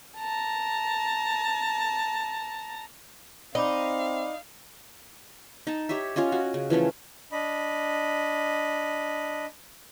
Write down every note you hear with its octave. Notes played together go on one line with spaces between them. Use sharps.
A5 A#5
C4 D#4 D5 F5 B5 D6
D#4 A5
G4 C#5 D#5 E5
C#4 F4 C#5 D#5
F#4
C#3
E3 F3 A3 C#4
D4 D#5 B5